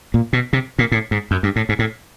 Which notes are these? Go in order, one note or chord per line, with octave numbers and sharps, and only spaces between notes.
A#2
B2
C3
A#2
A2
G#2
F#2
G2
A2
G#2
A2